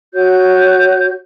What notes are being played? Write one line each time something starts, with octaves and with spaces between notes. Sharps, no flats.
F#4 C#5 G6